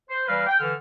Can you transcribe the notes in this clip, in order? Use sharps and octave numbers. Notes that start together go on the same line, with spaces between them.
C5
E3 G3 A#3 B4 F5
G5
D3 E3 F6